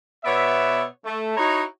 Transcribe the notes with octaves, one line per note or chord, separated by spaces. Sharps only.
B2 B3 C#5 D5 E5
A3
D#4 E4 F#4 C#5 D#5 A#5